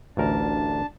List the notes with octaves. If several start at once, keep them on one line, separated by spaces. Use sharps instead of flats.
A1 D2 D4 A#4 A5